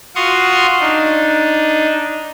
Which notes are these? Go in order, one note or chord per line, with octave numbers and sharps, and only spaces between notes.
F4 F#4 F5 C6 C#6 D#6
D4 D#4